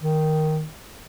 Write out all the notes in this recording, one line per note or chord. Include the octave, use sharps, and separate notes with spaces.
D#3